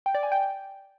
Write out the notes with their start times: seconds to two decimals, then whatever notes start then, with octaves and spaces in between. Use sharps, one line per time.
0.06 G5
0.15 D5
0.23 G#5
0.32 G5